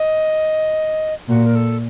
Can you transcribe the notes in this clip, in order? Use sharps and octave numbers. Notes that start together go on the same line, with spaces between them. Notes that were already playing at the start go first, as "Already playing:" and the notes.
Already playing: D#5
A#2 F#4
A#4
A4